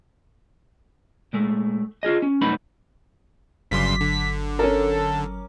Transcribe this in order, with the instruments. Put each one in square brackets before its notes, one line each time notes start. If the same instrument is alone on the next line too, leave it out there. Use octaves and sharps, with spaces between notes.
[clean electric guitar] A#2 G#3 A3
F4 G#4 D#5
C#4
C2 F#2 A3 B3 D#4 B5
[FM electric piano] G1 F#3 D6 [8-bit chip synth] G2 C#3 C6 [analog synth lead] B6
[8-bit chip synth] D3
[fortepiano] C#4 A#4 [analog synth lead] A4